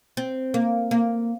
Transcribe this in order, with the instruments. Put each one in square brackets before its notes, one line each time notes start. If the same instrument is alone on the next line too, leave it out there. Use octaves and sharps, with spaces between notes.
[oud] C4
A#3
A#3